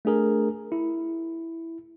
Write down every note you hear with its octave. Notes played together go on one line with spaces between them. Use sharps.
A3 D4 G#4 A#4
E4